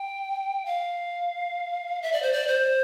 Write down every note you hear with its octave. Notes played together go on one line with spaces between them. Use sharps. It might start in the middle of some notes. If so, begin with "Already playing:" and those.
Already playing: G5
F5
E5
D5
C5
D5
C5